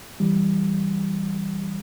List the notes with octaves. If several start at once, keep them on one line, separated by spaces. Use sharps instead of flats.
E3 G3